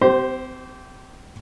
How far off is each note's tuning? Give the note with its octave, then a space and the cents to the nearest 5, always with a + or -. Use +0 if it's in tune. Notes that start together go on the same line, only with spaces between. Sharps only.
C4 -35 G4 -30 C5 +0